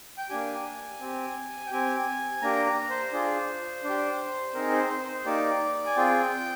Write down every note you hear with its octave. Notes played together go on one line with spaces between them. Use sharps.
G5
A#3 D4 G4 G#5
C4 G4
G5
C4 G4 G#5
A#3 D4 G4 A#5
A#5
C5
D4 F4 G#4
D4 G4
C4 D#4 G#4 A#4
C5
C5
C5
A#3 D#4 G4 D5
G#5
C4 F4 G#4 G5